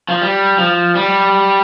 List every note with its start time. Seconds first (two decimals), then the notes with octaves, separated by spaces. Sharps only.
0.09 F3
0.22 G3
0.58 F3
0.95 G3